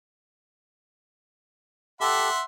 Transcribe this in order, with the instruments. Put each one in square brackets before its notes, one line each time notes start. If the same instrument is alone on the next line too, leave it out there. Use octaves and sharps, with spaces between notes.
[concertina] G4 A4 [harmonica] E5 F#5 C6